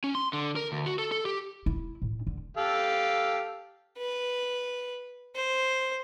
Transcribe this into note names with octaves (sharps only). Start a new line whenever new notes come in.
C#4
C6
D3
A#4
D2
F#4
A4
A4
G4
E4
A2
D3
G4 A4 F5
B4
C5